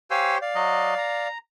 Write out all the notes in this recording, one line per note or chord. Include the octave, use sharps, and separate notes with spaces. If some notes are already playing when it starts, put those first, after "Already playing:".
G4 C5 C#5 F5 G#5 E6
D5 F5
F#3 D#5
A#5